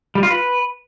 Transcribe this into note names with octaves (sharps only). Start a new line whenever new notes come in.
G3
F4
B4